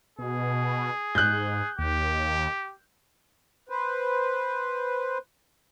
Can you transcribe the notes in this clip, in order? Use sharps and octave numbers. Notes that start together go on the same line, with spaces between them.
B2 G#4
G#2 F#6 G6
D#2 G4
B4 C5